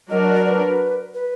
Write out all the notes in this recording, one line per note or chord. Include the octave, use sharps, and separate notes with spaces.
F#3 D4 F#4 A#4 D#5
D5
D5
B4
B4